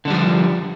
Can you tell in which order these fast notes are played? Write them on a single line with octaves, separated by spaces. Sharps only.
D3 D4 G3 F3